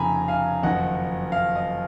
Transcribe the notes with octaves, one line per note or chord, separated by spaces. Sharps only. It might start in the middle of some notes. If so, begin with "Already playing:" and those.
Already playing: F1 F2 C#3 F3 A#3 G#5 A#5 B5
F5 G#5
F#1 F2 D#3 D#5 F#5
F5
D#5